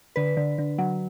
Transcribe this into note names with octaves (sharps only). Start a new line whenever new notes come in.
D3 B4
D3
D3
F#3